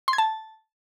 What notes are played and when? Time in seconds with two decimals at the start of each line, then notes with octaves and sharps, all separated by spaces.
0.08 C6
0.13 G#6
0.18 A5